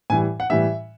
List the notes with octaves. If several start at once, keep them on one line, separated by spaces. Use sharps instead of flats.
A2 E3 G3 G#5
F#5
A2 E3 G3 E5